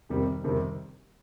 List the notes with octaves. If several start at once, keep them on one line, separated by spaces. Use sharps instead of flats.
F2 C3 D#3 G3 C4
F2 C3 D#3 G3 C4